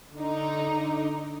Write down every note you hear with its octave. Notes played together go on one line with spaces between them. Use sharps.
D3 D#4